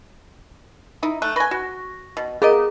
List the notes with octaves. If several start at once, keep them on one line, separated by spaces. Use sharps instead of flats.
D#4 E4
A3 F#6
B4 G#5 C#6 A#6
F#4
B2
B3 G#4 A#4 D#5 D6